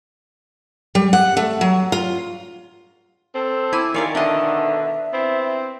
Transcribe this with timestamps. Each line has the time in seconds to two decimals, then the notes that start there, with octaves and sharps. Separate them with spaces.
0.95 G3
1.13 F#5
1.37 A3
1.61 F#3
1.92 F4
3.34 C4 A4
3.73 E4 G#5 D6
3.94 D#3 F4 G4 A#4 C#5 D5 F5 G#5
4.15 B2 D3 D4 D#5 E5
5.13 B3 C4 E4